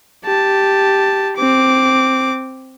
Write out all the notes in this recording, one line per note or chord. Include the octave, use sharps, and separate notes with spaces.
G4 A5
C4 D6